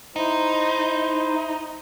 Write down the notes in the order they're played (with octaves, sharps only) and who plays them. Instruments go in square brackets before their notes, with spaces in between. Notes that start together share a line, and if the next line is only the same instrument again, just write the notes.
[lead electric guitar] D#4 [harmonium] E4 C5